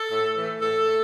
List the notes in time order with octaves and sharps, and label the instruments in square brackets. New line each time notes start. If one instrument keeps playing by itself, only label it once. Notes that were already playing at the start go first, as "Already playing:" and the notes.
Already playing: [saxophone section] A4
A2
E3 A3
A2 A4
A3